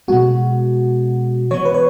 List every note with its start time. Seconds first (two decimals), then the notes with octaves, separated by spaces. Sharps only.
0.08 B2 G#3 B3 F#4
1.51 E3 C#5
1.54 B3
1.65 B4
1.74 C#5